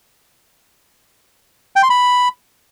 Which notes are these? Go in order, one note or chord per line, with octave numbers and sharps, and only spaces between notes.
G5
C6
B5